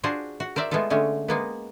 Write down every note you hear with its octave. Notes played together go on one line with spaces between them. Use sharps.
D4 F4 F#4 G#4 C5
F#4
A#4 C5 D5 E5
G#3 A3 B3 F4 A4
D3 G#3 A3 C#4
G#3 A#3 B3